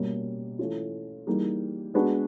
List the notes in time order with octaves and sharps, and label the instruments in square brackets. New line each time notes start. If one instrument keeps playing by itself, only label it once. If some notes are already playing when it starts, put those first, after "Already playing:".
Already playing: [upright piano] B2 G3 A#3 C#4
E3 A3 C#4 F4
E3 G3 A#3 D#4 G#4
G#3 B3 D4 F#4 B4